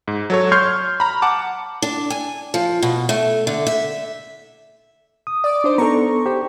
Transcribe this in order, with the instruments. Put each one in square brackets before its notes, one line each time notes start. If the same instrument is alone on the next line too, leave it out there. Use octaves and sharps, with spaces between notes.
[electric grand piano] G#2
F#3 A4 C#5
C6 C#6 F6 G6 G#6 C7
A#5 B5
F#5 A5 D6
[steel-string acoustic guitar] D4
G#5
F3
B2
A3
D3
E5
[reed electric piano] D#6
[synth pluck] D5 D6
D4 D#4 C5
[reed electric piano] B3 D4 A4 [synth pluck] A#5 C#6
[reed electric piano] G4 C5 G5